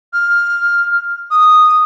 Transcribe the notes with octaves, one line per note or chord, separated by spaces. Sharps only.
F6
D#6